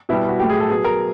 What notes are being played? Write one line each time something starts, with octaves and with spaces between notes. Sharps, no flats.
B2 G3 E4
F#4
A2 F#3 G4
G#4
A4
B2 F#3 G#4
A#4